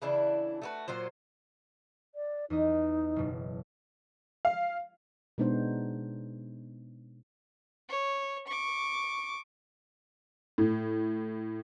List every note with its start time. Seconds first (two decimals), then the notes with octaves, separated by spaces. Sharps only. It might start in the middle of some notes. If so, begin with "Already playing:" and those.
0.02 C#3 E3 D4 E4
0.62 A3 F#4 B4
0.88 A#2 F#3 F4 C5
2.15 D5
2.50 E2 D#4 D#5
3.16 F#1 B2
4.45 F5
5.38 B2 G#3 B3 D4 D#4 C5
7.89 C#5
8.47 C#6 D6
10.58 A2